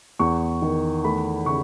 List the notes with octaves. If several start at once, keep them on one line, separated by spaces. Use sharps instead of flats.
E2 C#6
D#3
A3 B5
C#3 C#6